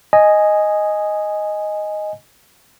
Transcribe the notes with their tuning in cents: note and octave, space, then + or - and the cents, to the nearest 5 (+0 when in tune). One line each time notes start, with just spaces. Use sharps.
D#5 +0 G#5 +0